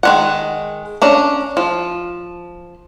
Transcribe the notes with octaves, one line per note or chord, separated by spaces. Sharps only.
D#3 G#3 F#5
C#4 D4 A#5
F3